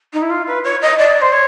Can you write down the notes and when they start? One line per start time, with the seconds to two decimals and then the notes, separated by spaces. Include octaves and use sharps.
0.13 D#4
0.22 E4
0.30 F4
0.47 B4
0.64 C#5
0.81 D#5
0.98 D5
1.21 C5
1.32 C#5